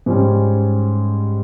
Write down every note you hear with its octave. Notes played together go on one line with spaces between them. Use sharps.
G#2 G3 C#4